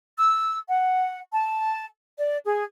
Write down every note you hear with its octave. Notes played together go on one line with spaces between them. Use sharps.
E6
F#5
A5
D5
G#4